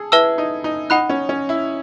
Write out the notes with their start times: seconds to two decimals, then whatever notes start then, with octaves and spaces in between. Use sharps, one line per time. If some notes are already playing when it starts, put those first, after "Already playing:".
Already playing: G#4 A4
0.12 E4 B4 E5 A5 E6
0.38 D#4
0.64 D#4
0.90 D#4 F#5 B5 F#6
1.10 C#4
1.29 C#4
1.49 E4